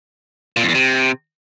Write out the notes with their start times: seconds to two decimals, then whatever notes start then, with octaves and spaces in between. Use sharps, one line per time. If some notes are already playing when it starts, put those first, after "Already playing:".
0.57 A#2
0.63 F2
0.69 E2
0.75 C3